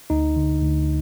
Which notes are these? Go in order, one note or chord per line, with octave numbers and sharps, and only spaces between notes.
D2 D#4
D3
D2